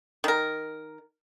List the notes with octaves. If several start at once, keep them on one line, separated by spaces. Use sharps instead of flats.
D#3 A#4